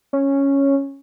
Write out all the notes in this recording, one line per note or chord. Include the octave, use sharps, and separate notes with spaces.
C#4